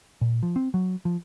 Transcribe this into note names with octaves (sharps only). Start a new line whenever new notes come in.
A#2
F3
C4
F#3
F3